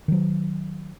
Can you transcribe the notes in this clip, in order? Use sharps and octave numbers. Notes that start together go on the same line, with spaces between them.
D#3 F#3